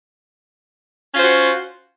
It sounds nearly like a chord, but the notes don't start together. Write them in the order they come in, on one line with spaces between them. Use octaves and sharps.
C#4 F4 C5 F#4